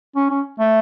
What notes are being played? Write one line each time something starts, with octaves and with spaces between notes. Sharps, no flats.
C#4
C#4
A3